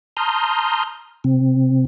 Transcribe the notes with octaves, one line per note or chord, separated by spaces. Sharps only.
A5 A#5 C6 D#6 F6 G6
C3 C4